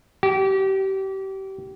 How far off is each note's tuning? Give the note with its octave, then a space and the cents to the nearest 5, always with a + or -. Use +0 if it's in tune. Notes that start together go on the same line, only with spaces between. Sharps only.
G4 -30